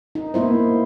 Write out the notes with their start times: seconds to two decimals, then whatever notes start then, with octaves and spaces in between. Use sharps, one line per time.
0.15 D#4
0.34 A#3 B3 E4 C5